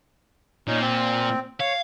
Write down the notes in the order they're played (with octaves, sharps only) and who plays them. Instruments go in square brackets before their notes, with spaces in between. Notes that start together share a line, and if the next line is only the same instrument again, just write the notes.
[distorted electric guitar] A#2 [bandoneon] C#4 D#4
[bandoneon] C4
[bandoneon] C#5 [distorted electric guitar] F5